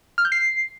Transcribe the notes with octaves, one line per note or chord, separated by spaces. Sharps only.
F6
G6
C7